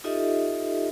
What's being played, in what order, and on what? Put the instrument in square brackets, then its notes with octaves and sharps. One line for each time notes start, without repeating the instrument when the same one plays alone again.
[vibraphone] D#4 F4 G4 A4 D#5 E5